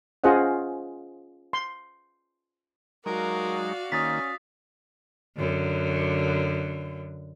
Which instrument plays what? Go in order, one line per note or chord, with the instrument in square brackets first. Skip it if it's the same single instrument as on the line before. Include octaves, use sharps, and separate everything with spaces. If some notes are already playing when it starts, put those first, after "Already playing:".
[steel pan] C#4 F4 G#4 C5 D#5 F#5
C6
[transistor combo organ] F#3 G#3 D#4 [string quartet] F#4 D5 F5 [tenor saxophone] A#4
[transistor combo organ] D#3 A#3 [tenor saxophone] C#4 [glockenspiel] D#6 A6 B6
[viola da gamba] F#2 D3